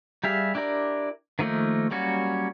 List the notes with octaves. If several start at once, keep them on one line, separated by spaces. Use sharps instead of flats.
G3 G4 G#4 E5 F5
D4 E4 G4 A#4 D5
D#3 F3 A3 A#3 D#4
F#3 G3 A#3 C#4 F#4